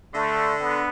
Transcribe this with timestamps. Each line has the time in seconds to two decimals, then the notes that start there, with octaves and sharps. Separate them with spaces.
0.14 D3 A3
0.60 B3